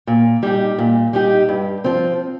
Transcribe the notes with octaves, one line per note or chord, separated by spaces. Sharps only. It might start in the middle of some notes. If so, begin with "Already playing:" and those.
A#2
G3 D#4 G4
A#2
G3 D#4 G4
G2
F3 C4